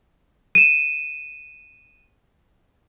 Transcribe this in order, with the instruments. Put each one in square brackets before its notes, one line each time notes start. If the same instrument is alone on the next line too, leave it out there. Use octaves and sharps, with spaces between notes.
[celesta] D#7 E7